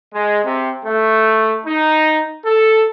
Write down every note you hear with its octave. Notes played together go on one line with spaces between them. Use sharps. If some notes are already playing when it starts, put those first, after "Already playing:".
G#3
C3
A3
D#4
A4